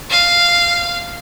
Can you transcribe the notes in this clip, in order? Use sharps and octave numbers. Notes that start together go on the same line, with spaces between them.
F5